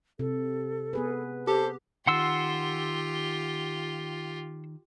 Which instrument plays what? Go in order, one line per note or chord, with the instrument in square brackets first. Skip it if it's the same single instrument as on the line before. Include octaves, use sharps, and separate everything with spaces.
[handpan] C3 [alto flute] A4
[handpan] B3 G#4 B4
[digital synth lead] G4 [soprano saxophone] A4 [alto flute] C5
[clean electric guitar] D#3 [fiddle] F4 G4 [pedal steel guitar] F#5 C6 E6